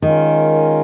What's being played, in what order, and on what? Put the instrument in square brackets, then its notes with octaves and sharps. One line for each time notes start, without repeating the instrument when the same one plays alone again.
[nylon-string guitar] D#3 [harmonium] G#3 C#4 F4 A#4